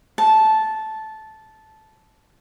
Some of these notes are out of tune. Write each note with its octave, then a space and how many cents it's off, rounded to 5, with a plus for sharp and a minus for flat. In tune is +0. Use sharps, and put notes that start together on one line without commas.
A5 -10